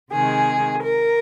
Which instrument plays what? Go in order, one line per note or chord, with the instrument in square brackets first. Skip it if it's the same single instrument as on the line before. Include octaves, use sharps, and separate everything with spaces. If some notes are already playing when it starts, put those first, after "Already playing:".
[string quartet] C3 D#3 G#3 G#4
A#4